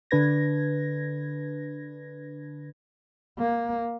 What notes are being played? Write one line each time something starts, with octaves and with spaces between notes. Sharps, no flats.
D3 D4 B4 G#6 A#6
A#3